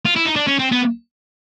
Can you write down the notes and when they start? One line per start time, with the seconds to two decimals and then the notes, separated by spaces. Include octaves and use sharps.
0.06 F4
0.16 E4
0.26 D#4
0.36 D4
0.47 C#4
0.59 C4
0.72 B3